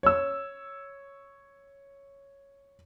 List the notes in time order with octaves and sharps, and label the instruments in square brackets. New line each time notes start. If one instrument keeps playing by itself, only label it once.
[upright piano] C#5 E6